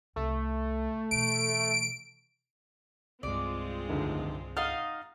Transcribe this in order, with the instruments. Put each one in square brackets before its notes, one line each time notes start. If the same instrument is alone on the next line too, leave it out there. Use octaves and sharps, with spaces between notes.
[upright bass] C2 C4 [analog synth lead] A3
[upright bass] B2 E3 [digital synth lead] D7
[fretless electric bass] C2 G2 [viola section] G#3 C4 F4 [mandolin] D5
[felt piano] F1 D2 D#3
[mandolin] D#4 D#5 F5 [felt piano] F#5 F6 A6